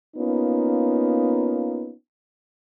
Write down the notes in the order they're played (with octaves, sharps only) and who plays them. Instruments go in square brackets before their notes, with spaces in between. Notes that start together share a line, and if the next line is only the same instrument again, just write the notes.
[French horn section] A#3 B3 C#4 D#4 F4